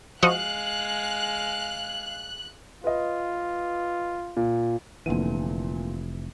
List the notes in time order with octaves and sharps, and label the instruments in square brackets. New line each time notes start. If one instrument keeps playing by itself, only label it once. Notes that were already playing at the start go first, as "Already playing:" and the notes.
[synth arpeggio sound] F3 F#4 D#5 [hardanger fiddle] G#3 F5 [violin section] F#6
[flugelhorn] F4 [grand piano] B4 D#5
[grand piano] A#2
[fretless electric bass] F1 E3 [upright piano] A#2 D3 D#7